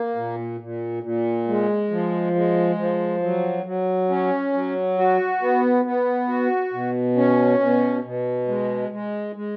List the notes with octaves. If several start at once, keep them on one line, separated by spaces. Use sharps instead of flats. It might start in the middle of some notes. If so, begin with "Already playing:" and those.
Already playing: A#3
A#2
A#2
A#2
G#3
F3
G#3
F3
F#3
F#3
C#4
F#3
F#4
B3
B3
F#4
B2
C#4
B2
B2
G#3
G#3
G#3